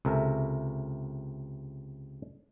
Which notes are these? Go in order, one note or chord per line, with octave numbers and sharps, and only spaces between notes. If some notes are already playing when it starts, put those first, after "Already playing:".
C#2 C3 A4 A#4 E5